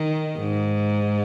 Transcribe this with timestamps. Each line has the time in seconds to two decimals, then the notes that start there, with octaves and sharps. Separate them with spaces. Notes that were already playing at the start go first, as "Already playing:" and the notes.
Already playing: D#3
0.38 G#2